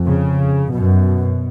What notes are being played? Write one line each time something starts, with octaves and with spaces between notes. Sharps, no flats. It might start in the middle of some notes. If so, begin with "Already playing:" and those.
Already playing: F2
C#3
F#2 B2